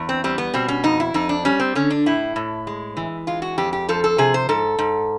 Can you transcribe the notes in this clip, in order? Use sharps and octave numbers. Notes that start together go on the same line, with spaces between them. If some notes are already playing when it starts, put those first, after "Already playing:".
Already playing: E2
C4
G3 C4
B3
B2 C4
C#4
F2 D#4
E4
F2 D#4
D4
G3 C#4
C4
D3 C#4
D4
A2 E4
A2
G#3
E3
G#3 F4
F#4
F2 G4
G4
F3 A4
A4
C3 G#4
C5
G#2 A4
G#2